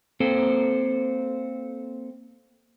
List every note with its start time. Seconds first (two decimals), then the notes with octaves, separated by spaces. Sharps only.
0.20 A#3 C4 A4 C5 G5